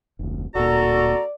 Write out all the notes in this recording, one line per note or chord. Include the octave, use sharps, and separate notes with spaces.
F1 D2
D1 A#2 F#4 A4 D5 A#5